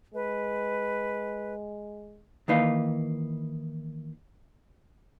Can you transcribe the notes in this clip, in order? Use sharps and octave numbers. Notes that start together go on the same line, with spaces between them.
G#3 B4
D#3 E3 A#3 D#4 B4 F5